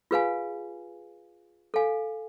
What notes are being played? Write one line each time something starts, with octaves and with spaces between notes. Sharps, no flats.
F4 G#4 B4 F5 G#5
A4 F5 G#5